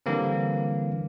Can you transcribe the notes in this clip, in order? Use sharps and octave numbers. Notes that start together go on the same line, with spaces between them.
D3 E3 G3 A#3 C4